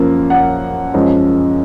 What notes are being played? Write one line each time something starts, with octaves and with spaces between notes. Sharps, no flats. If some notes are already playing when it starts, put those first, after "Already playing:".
Already playing: F#2 F3 A#3
F#5
F#2 F3 G#3